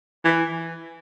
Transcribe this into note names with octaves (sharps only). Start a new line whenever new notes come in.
E3